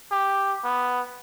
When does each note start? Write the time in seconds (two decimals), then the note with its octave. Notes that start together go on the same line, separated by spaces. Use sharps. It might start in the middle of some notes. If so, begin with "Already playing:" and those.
0.12 G4
0.64 B3